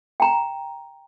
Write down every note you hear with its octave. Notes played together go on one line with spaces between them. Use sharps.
G5 A#5